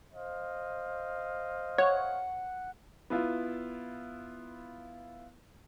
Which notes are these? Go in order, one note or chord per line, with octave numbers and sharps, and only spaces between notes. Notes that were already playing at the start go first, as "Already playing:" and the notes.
C5 D#5 F5
C#5 F#5
B3 E4 F4